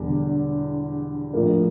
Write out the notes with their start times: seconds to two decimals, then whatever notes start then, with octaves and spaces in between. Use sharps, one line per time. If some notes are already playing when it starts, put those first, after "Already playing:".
Already playing: E1 E2 D3 G3
1.33 A#1 A2 F3 A#3 A#4